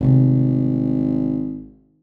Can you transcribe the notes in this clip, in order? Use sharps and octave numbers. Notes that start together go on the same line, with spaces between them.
G#1 C3 A3